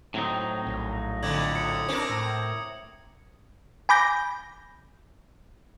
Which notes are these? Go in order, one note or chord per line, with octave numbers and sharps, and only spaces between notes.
A2 F#3 C4 D#4
A#1
F2 D3 D6 G#6 F#7
D#6 C#7
C4 D4 A#4
A2
G#5 B5 D6 G6 A#6